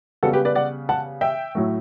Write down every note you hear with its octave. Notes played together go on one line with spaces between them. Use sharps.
C#3 G3 B3 F#4 A4
G4 B4
B4 D5
D5 F#5
F#5 A5
E5 G5
A2 F#3 A3